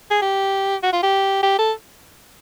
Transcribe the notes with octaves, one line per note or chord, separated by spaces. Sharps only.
G#4
G4
F#4
F4
G4
G4
A4